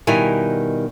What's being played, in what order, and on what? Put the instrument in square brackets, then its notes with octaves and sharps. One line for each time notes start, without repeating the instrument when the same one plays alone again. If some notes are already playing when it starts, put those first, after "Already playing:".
[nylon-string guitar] B2 D#3 G3 E4 G#5